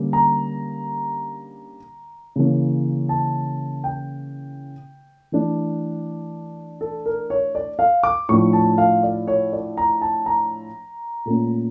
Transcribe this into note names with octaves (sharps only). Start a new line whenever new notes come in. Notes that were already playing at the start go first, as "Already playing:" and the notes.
Already playing: D3 G3 A#3 C#4
A#5
C#3 E3 A#3 C#4
A5
G5
E3 A3 D4
A4
A#4
C#5
D5
F5
D6
A2 F3 A3 D4 C#6
A5
F5
D5
C#5
D5
A#5
A5
A#5
A#2 A3 C#4